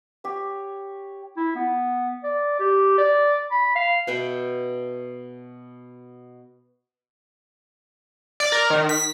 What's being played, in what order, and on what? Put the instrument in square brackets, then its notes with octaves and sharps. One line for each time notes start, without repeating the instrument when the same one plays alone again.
[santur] G4 C#5
[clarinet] E4
B3
D5
G4
D5
B5
F5
[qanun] B2 B4 E5 G5
[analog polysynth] D5
A#4
D#3
B6